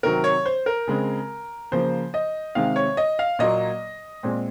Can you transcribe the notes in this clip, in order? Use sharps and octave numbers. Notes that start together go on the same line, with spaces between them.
C3 D#3 F#3 C4 A#4
C#5
C5
A#4
C#3 G#3 C4
C#3 F3 A#3 C5
D#5
C3 D#3 G#3 F5
C#5
D#5
F5
A#2 F#3 A#3 D#5
A#2 G#3 C4